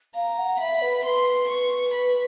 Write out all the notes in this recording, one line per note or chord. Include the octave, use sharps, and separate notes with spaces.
F5 A#5
F#5
E5 B5
B4
B4 C6
C#6
B5